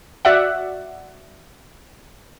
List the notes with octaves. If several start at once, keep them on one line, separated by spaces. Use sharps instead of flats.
F#4 D5 E5 F#5